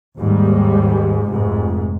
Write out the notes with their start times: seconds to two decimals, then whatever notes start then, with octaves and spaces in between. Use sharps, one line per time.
0.18 D#2 G#2 G3
1.27 F1 G#2